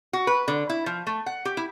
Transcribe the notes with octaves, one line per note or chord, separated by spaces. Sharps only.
F#4
B4
D3
E4
F3
A3
F#5
G4
E4